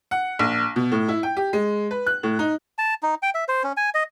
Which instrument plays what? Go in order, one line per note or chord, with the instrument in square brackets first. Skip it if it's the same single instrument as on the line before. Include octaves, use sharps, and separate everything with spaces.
[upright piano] F#5
A#1
B2
A2
E4
G5
G4
G#3
B4
F#6
A2
D#4
[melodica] A5
D#4
G5
E5
C5
C#4
G#5
D#5